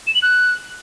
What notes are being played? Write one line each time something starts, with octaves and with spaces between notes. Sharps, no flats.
E7
F#7
F#6